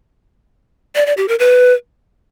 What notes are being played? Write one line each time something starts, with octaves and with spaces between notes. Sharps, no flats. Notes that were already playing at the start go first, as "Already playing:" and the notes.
D5
D5
G4
A#4
B4